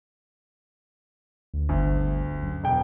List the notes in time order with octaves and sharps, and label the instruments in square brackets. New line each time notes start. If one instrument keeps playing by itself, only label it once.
[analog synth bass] D2
[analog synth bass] G1 [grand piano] D2
[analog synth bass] F#2
[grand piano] E1 G5